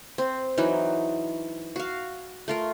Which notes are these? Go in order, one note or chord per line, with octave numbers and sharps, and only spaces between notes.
C4
E3 F#3 D#4
F#4 F5
A3 F4 A#4